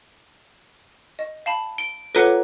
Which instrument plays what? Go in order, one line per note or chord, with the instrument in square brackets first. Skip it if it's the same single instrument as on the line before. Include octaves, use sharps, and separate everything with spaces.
[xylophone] D#5
F5 A5 B5
[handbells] D7 [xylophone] G7
[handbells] F4 A4 [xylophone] B4 C#5 F#5